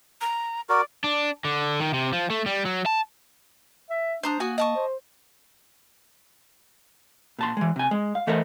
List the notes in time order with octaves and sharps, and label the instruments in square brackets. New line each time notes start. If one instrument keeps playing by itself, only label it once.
[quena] A#5
[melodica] F#4 A#4 [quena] D5
[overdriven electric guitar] D4
D3
D#3
C3
F3
A3
G3
F#3
A5
[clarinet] E5
[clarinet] D4 [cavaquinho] C5 A#5 D#6
[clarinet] A#3 [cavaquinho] F#4 G#5 D#6
[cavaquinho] D#5 A5 C#6
[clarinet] C5
[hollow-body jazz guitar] A#2 A5 C6
E3 G#3
C3 G#5
G#3
F5
E3 A3 A4 A#4 C5 D#5